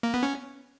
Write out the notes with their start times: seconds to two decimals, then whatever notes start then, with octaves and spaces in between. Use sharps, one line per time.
0.03 A#3
0.14 B3
0.23 C#4